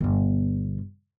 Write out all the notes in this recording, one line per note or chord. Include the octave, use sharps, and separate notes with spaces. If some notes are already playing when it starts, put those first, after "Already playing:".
G1 B2